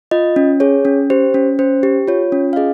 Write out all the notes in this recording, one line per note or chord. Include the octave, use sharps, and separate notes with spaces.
F4 D#5
C#4
G#4 C#5
C#4
G4 C5
C#4
C#4 C5
G4
F4 C#5
C#4
F5
G#4 D#5